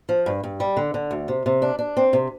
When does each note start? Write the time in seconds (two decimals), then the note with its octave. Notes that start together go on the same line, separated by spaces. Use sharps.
0.09 F3
0.26 G2
0.43 G2
0.60 G3
0.77 D3
0.94 D3
1.11 D2
1.28 C3
1.46 C3
1.62 D4
1.79 D4
1.97 C4
2.13 C3